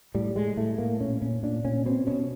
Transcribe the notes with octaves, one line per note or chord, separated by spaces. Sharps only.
A2 G3
A2 G#3
A2 A3
A2 A#3
A#2 C#4
A#2 C#4
A#2 D4
A#2 C#4
B2 C4
B2 C#4